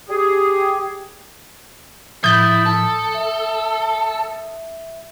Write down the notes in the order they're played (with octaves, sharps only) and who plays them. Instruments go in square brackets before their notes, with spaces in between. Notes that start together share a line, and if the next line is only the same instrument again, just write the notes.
[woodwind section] G4 G#4
[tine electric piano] A2 F3 [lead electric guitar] E4 [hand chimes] D#6 A6 [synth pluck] G6
[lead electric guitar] A4
[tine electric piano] E5